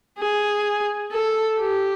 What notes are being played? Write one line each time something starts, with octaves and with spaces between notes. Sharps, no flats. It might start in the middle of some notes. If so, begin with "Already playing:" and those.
G#4
A4
G4